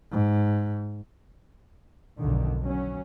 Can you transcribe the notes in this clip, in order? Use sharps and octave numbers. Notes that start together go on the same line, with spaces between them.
G#2
B1 F2 D3 D#3
F#3 C#4